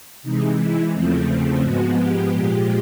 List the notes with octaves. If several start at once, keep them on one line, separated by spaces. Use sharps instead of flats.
C3 E3 G#3 D#4
E4
E2 C#3 F3 A3 C4
G#2 F3 G#3 B3 F#4
G4
A#2 F3 G#3